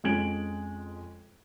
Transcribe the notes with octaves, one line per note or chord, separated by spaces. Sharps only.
F2 G#3 C#4 G#6 D7 F#7